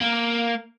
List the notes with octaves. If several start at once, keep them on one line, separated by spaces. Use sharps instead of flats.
A#3